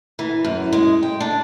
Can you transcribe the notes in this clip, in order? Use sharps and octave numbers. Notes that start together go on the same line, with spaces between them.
E3
F#2
G#3
G5
D4